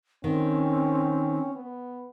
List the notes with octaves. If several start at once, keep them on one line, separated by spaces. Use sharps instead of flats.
D#3 C4 C#4
B3